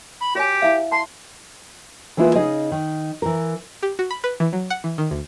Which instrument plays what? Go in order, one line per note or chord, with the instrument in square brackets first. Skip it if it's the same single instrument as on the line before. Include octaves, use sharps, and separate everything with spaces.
[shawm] B5
[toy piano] F#4 C#5 G#5 [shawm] G4
[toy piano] E4 E5 F5
[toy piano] A5 [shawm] C6
[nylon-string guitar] E3 G#3 A#3 E4 F4 B4
C#3 D#4 G#4 D#5
D#3
E3 A#4
[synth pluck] G4
F#4
B5
B4
E3
F#3
F#5
E3
D#3
D2